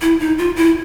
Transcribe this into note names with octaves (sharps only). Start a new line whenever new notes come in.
E4
D#4
F4
E4